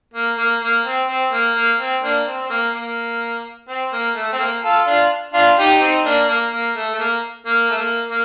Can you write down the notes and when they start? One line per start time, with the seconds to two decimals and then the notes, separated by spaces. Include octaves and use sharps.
0.14 A#3
0.38 A#3
0.61 A#3
0.85 C4
1.08 C4
1.33 A#3
1.55 A#3
1.79 C4
2.03 A#3 D4
2.27 C4
2.42 C4
2.50 A#3
2.74 A#3
3.68 C4
3.93 A#3
4.15 A3
4.33 C4
4.39 A#3
4.63 F4 A4
4.86 D4 F4
5.34 D4 F4
5.58 D#4 G4
5.81 C4 D#4
6.04 A#3 D4
6.28 A#3
6.52 A#3
6.76 A3
6.94 A3
7.00 A#3
7.46 A#3
7.71 A3
7.78 A#3
8.09 A#3